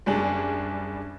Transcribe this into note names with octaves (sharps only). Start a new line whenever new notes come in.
F#1 G3 D4 G#4 F#7